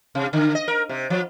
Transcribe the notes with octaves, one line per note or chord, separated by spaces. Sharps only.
C3
D3
D#5
A#4
C3
F3